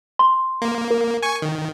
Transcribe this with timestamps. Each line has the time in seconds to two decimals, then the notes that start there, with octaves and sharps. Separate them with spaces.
0.19 C6
0.62 A#3
0.91 A#4
1.23 G#5 C#6
1.42 D#3